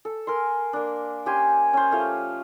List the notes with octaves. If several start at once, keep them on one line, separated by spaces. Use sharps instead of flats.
A4
A#4 G#5 C6
A#3 D4
C#4 G4 G#5 C6
C#4 C5
F3 A3 C#5 F5